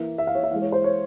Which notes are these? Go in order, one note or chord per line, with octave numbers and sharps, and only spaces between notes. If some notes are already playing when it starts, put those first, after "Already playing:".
Already playing: E3 A#3 E5
E5
F5
C#5
E5
E3 G#3 F5
C#5
C5
C#5